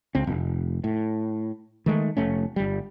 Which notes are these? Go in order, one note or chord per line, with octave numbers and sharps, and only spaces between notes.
C#2 C4
F1
A2
D#3 G#3 A3
F1 A3 C#4
G1 G3